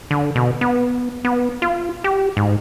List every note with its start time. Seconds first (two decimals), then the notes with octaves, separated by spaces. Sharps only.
0.11 D3
0.36 B2
0.61 B3
1.25 B3
1.62 F4
2.04 G4
2.37 G#2